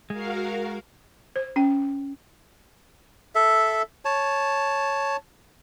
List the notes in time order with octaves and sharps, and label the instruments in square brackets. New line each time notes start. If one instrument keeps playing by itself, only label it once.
[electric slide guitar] G#3 [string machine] F#4 A#4 F5
[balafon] C5
C#4 G5
[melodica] A4 E5
C#5 A5